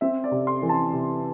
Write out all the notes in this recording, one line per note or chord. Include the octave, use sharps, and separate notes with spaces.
C4 E5
D5
C3
C6
E3
A5
C3